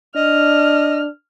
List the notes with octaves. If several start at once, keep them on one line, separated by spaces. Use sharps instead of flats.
D4 D#5 F6